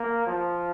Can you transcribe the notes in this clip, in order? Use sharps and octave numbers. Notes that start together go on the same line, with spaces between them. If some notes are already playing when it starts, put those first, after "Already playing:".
Already playing: A#3
F3